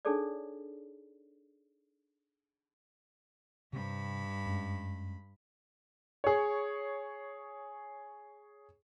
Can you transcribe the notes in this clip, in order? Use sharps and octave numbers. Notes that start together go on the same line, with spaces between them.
D4 D#4 G#4 A4 C#5 D5
G2 C3 C4 B5
F#2 G#3
G#4 C#5